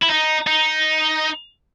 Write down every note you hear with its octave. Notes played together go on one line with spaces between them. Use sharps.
E4
D#4
D#4